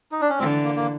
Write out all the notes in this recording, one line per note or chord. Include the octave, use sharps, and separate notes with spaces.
D#4
D4
C#4
D3 E3 C4
A#3
A#3